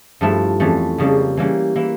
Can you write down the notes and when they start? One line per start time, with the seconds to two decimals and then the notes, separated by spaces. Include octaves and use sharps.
0.21 G2 F3 A3 E4
0.60 F2 E3 A3 C#4
0.98 F2 C#3 G3 A#3
1.37 E3 G3 A#3 C#4
1.76 E3 A#3 E4